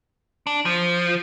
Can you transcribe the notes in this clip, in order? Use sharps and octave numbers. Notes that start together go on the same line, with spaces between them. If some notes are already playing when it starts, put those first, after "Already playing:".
D4
F3